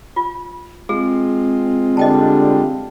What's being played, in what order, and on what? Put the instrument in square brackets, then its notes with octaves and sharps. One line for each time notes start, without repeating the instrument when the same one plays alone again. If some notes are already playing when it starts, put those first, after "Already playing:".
[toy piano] F4
[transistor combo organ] G#3 F4 [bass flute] C4 [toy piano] G#4
[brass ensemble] D3 G3 D4 [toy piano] D#5 G5 A5